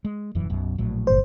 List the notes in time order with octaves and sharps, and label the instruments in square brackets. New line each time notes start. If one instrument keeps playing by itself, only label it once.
[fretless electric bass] G#3
E1 F#2 E3
B1 F#2 B2
A#1 A2 F#3
[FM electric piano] G1 C5